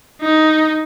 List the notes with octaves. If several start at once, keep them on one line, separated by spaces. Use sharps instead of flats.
D#4